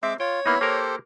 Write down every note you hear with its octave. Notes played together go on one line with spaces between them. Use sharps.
G#3 C4 E5 D6
F4 C#5 G5
A#3 B3 D#4 E4
A#3 G4 A4 A#4 C5